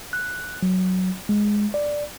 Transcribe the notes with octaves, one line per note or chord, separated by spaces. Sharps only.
F#6
F#3
G#3
D5